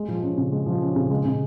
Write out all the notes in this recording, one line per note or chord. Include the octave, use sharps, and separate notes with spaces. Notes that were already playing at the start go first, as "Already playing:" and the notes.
Already playing: G#3
F3
C#4
C#3
G#3
F3
C#4
C#3
G#3
C#3